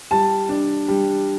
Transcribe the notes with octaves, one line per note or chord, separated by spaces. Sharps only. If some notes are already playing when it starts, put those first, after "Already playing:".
G3 A5
D4
G3